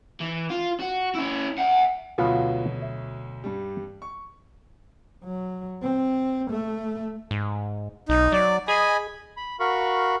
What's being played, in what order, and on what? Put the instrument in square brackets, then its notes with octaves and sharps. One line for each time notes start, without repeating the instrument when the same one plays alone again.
[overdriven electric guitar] E3
F4
F#4
C#4 E4
E5 F#5
[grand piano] D2 B2 F#3 [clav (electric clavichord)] B3 F4 F#4
[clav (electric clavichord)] E5
[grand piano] G2 G3
C#6
[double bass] F#3
C4
A3
[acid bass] G#2
[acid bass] B1 [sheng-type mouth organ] D#4
[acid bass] F#3 [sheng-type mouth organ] D5
[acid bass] G#4 [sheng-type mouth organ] D#5 G#5 B5
[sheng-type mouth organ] B5
F#4 A#4 F5 B5 C#6